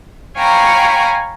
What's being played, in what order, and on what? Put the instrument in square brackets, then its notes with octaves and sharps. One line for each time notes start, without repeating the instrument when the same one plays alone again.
[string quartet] C#5 F5 G5 G#5 A#5 B5